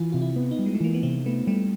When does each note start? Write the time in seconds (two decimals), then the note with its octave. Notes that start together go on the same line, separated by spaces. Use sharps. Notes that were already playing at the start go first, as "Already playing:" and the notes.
Already playing: E3 F4
0.12 C3 F4
0.22 E4
0.36 B3
0.51 D#4
0.59 G3
0.66 G#3
0.75 A3
0.80 E3 A#3
0.94 B3
1.03 C3 C4
1.26 A3 B3
1.47 G3 A3